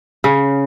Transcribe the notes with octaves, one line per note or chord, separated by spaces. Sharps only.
C#3